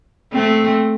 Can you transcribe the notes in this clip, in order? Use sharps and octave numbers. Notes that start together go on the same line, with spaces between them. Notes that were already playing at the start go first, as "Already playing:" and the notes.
A3 C4